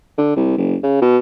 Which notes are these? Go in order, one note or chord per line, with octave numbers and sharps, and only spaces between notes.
D3
C2
F#1
C#3
B2